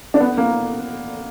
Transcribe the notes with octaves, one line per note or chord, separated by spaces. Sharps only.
D4
B3
A#3